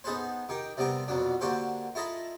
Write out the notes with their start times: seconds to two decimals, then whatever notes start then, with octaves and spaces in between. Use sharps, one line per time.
0.04 B3 D#4 G#4 A4 B4 C5
0.49 D#3 D#4 G4 G5
0.77 C3 G3 B3 G4 A#4
1.08 F2 B2 F#3 D4
1.41 D3 A#3 F#4 G4 A4 C5
1.95 E4 F4 A4 D#5 A#5 B5